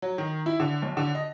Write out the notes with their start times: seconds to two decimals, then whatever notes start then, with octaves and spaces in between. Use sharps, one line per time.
0.02 F#3
0.18 D#3
0.46 E4
0.60 D3
0.82 B1
0.97 D3
1.15 D#5